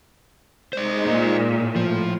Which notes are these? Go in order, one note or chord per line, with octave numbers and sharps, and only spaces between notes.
G#3 D#4 C5 D5
A#2
A2
F3